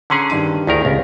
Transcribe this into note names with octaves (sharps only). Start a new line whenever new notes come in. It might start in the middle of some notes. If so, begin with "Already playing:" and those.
D3 C#4 G#4 A#5 C6
G2 D#3 D#7
D2 D#3 E4 G#4 A#4
C#2 C3